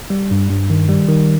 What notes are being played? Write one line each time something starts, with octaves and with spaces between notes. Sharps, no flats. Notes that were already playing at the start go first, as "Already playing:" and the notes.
G3
G2
G2
D#3
G3
D#3